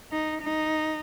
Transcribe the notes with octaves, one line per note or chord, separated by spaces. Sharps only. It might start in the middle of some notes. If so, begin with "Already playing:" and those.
D#4
D#4